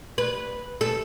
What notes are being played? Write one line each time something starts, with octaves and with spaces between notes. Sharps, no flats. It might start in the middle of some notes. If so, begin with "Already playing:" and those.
B4
A4